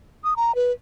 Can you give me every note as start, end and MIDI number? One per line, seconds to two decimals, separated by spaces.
0.24 0.34 87
0.37 0.55 82
0.55 0.72 71